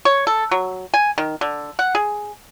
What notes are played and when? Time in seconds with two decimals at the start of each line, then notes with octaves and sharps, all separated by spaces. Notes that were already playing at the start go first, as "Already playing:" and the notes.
0.05 C#5
0.27 A4
0.51 F#3
0.94 G#5
1.18 D#3
1.41 D3
1.79 F#5
1.95 G#4